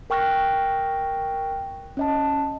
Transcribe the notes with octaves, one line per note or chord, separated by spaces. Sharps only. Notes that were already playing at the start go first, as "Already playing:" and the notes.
A#4 G5 C#6 F6 F#6 A#6
C#4 D#5 A5